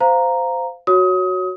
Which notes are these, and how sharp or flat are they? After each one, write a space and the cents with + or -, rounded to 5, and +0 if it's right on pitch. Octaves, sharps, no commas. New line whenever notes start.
C5 -15 F5 +0 A#5 +0
F#4 +0 C#5 +0 D#6 +25